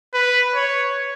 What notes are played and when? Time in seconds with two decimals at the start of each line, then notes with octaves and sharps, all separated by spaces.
0.14 B4
0.55 C#5